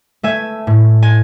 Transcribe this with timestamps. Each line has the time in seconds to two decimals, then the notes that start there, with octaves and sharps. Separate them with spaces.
0.23 A3 E5 G#5
0.67 A2
1.03 G#5